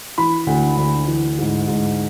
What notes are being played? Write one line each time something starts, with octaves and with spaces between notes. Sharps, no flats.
E3 B5
D2
D2
E3
G#2
G#2